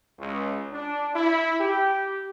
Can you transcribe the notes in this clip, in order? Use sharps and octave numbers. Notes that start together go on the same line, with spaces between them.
C#2
D4
E4
G4